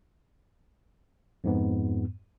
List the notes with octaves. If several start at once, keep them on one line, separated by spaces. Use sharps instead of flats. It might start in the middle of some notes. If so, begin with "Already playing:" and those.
F2 G#2 B3